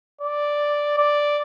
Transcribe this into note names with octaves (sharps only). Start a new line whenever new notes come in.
D5
D5